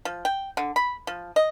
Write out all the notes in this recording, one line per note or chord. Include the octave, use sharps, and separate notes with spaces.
F3
G5
D3
B5
F3
D#5